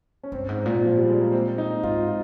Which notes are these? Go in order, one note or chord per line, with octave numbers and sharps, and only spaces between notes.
C#4
G2 C4
G#2
A#2
F3
G3
G#3
A#3
C4
D#4
G#2 F4
F4